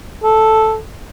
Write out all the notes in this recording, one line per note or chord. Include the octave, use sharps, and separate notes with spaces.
A4